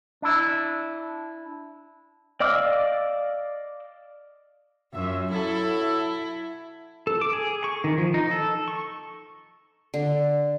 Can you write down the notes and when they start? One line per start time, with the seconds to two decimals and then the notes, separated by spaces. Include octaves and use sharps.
0.22 D4 E4
2.40 D5 D#5 F5 D6 E6
4.94 F#2 F4 F#4 E5
5.32 F#3 E4 A4
7.07 A4
7.21 D6
7.33 G#4
7.64 C#6
7.84 D#3
7.98 F3
8.14 D#4
8.31 A4
8.68 C#6
9.94 D3